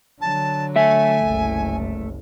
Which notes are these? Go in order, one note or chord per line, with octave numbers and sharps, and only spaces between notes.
D3 F#3 A5
A3 E5 G#5
F#1 C2